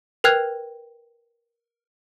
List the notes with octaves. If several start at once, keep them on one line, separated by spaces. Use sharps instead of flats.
A#4 B4 G5 F6 F#6 G#6